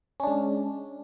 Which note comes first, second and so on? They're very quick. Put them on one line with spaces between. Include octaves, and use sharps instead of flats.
C#4 D4 G#3